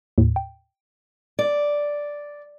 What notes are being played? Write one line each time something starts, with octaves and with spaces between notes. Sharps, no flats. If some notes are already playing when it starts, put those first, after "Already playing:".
D#2 A2
G5
D5